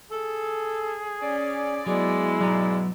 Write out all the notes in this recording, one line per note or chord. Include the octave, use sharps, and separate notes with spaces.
G#4 A4
C#4 D5
F#3 G#3 B3 E4
G#2 B2 F#3 D5 A#5